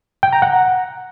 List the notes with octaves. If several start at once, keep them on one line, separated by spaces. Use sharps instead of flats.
G5
A#5
F#5